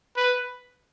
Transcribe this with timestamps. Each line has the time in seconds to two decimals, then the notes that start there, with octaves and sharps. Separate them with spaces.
0.17 B4